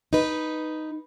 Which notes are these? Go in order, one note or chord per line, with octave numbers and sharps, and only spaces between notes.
D#4 B4